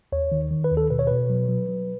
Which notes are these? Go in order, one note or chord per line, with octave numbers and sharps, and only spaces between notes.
D#2 C#5
D#3
D#3
B4
D#2
A4
B2 B4
C#5
B2 B4
F#3
F#3
F#3